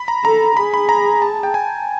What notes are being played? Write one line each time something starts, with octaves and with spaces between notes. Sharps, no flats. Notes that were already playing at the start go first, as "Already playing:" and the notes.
Already playing: B5
A#5
A4 A#5
G#4 B5
B5
A#5
A5
G5
G#5